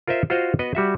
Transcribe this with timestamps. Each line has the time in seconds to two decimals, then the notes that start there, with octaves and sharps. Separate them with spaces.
0.08 F4 A#4 C5 D#5 E5
0.30 F4 F#4 C5 D#5 F5
0.59 B3 F#4 B4 D#5
0.75 G3 F#4 E5